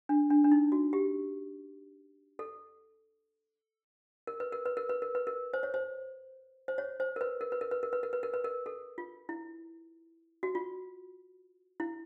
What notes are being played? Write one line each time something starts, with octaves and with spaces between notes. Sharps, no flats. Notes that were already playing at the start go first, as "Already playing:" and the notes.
D4
D4
D4
D#4
F#4
G4
A4
A#4
B4
A#4
B4
A#4
B4
A#4
B4
A#4
C5
C#5
C5
C5
C#5
C5
A#4
B4
A#4
B4
A#4
B4
A#4
B4
A#4
B4
A#4
B4
A#4
A4
F4
E4
F#4
F4
E4